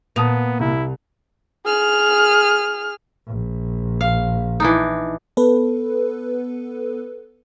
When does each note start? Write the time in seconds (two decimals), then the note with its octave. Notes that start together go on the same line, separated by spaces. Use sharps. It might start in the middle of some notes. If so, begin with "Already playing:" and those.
0.16 A#2 B3 A5 D#6 F7
0.60 C2 E4
1.66 G#4 F6
3.27 A#1
4.01 F5
4.60 E3 D4 D#4
5.37 B3 A4 B4